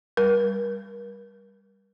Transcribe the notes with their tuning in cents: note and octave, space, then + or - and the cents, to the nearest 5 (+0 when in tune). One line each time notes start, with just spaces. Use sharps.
G3 +15 A#4 +35